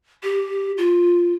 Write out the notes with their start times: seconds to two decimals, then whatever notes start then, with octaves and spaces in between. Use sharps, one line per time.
0.23 G4
0.78 F4